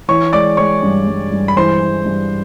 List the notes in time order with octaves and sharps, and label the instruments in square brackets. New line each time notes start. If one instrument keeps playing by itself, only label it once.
[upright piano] E3 [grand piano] C#5 C#6
[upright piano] G#3 [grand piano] D5 D6
[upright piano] G#3 [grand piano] C#5 C#6
[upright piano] G2
G2
G2
[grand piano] B5
[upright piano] E3 [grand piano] C5 C6
[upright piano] E3
G2